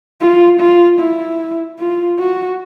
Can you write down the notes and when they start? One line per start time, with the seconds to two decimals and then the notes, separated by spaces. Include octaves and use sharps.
0.21 F4
0.61 F4
1.00 E4
1.79 F4
2.19 F#4